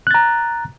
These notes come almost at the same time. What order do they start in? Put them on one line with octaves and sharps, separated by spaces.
F#6 A6 A#5